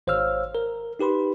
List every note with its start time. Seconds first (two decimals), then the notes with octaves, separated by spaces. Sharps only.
0.07 G#1 C5 C#5 F5 E6 F6
0.55 A#4
0.99 D#4 G4 B4 B5 C6